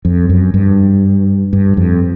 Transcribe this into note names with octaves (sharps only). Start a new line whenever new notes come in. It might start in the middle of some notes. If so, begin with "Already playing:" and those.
F2
F#2
G2
G2
F2